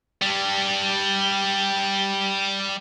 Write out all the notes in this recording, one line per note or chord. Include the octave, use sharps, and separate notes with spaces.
G3 D4